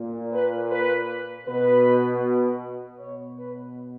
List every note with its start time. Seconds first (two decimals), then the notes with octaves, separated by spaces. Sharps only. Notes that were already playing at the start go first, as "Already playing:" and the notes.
Already playing: A#2
0.31 B4
0.71 B4
1.46 B2 B4
2.99 B2 C#5
3.38 B4